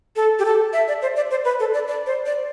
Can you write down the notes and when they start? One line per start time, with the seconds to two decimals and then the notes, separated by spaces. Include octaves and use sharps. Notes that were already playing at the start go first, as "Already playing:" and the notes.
0.16 A4
0.39 G4
0.45 A4
0.73 E5
0.88 D5
1.02 C5
1.16 D5
1.31 C5
1.45 B4
1.60 A4
1.74 D5
1.88 D5
2.06 C5
2.26 D5